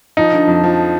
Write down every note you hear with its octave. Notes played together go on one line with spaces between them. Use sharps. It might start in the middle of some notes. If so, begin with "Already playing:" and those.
F3 D#4
D3
F2
F3